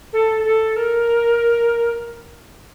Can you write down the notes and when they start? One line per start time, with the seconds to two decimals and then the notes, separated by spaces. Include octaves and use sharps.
0.13 A4
0.44 A4
0.76 A#4